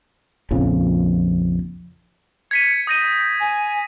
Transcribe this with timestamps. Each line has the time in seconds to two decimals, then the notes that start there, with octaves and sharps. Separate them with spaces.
0.51 A#1 F2 C#3
2.51 G#6 B6 C#7 D#7
2.87 D#6 G6 A#6 D#7
3.40 G#5